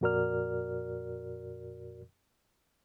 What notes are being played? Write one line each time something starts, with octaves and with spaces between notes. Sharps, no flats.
F2 A#2 F#4 A#4 D5 F6